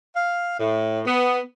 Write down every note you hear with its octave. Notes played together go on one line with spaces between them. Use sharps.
F5
A2
B3